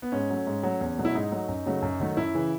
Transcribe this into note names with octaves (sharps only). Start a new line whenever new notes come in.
B3
G#2 C#4
F#3 A3
G#2
F#3 A3
E2
B2 F#3 A3
E4
G#2 D#4
F#3 A3
F#2
C#3 F#3 A3
F#2
D#3 F#3 A3
F#2 E4
C#3 E3